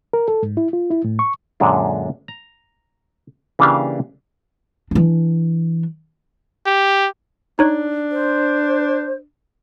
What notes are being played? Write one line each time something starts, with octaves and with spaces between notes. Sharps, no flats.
A#4
A4
G#2
E4
F4
E4
A2
C#6
F#2 A#2 D3 G#3 D4
A#5
C#3 E3 A#3 D4 G4 F5
E3 D4
G4
D4 D#4 C#5 F#6
C5